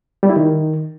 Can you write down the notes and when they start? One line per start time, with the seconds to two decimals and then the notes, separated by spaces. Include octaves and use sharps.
0.23 G3
0.29 E4
0.36 D#3